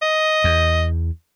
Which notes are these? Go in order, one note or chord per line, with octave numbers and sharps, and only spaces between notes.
D#5
E2